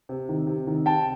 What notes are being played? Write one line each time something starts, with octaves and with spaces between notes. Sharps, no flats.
C3
D#3
C3
D#3
C3 G5 A5